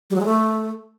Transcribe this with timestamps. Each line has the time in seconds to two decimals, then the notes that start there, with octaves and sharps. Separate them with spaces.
0.10 G3
0.15 F#3
0.20 G#3
0.25 A3